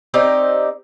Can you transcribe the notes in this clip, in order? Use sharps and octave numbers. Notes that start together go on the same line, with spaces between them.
C4 D#4 G4 D5